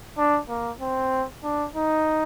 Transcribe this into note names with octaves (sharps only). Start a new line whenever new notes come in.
D4
A#3
C4
D4
D#4